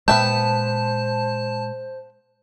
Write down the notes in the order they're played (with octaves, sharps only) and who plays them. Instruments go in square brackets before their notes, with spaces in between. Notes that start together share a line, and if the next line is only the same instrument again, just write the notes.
[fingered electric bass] A#2 G#3 [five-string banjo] B3 E5 G5 [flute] C5 [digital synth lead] A5